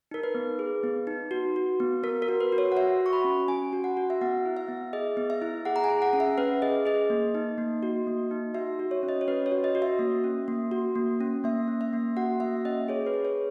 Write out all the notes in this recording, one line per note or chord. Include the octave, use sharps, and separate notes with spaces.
D#4 A#4
B4
B3
G#4
B3
D#4
F#4
F#4
B3
B3 A#4
A#4
F#4
B4
F#4
C#5
F#5
F#4 E5
F#4
C#6
B5
C#4
C#4 G#5
F#4
F#5
F#4
E5
B3 F#5
E4
E5
B3
G#4 D#5
B3
E5
E4
G#4 F#5
A#5
G#5
G#4
F#5
C#4
E5
C#4 B4
G#4 D#5
G#4 D#5
A#3
D#4
A#3
F#4
A#3
D#4
F#4 E5
F#4
C#5
C#4
D#5
C#5
C#4 B4
C#5
F#4
D#5
F#4
E5
A#3
C#4
A#3
F#4
A#3
C#4
A#3 E5
C#4
E5
A#3
F#4 F#5
A#3 E5
C#4 D#5
G#4 C#5
B4
G#4
C#5